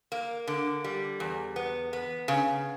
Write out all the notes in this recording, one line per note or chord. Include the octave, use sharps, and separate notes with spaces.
A#3
D3
G3
E2
B3
B3
C#3